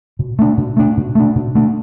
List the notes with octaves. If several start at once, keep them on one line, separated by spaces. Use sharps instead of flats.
B2
A3 D4
B2
A3 D4
B2
A3 D4
B2
A3 D4